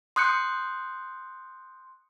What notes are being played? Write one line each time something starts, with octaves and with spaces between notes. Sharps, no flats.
C6 D#6 F#6 G6 C#7